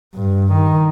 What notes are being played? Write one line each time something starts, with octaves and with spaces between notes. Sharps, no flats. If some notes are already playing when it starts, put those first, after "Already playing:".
G2
D#3